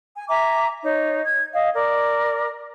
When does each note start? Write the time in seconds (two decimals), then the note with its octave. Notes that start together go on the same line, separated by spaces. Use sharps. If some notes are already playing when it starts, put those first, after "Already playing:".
0.15 G#5
0.28 E5 G#5 A#5 D6
0.83 D#4 C#5
1.24 G#6
1.54 D#5 F5
1.73 A#4 D5